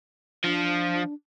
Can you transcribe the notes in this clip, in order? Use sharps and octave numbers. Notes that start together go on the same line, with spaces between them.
F3 D4